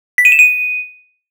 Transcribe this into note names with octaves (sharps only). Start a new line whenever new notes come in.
B6
D#7
E7
D#7